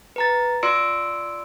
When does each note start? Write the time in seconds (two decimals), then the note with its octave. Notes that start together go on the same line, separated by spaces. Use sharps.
0.16 B4 A#5 A6
0.63 F4 D5 C6 E6 C#7 D7